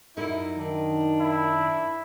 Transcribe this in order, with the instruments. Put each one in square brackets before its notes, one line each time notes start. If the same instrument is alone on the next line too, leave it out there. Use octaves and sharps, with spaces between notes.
[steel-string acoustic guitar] F#2 D#4 A#4 [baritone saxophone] E4
[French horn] D#3 [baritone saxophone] D4
[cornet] E4